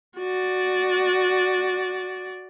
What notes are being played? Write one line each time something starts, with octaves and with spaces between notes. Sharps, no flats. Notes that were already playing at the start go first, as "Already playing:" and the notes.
F#4 D5